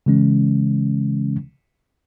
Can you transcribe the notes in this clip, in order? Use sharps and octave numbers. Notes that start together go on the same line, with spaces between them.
C#3 E3 G#3 C#4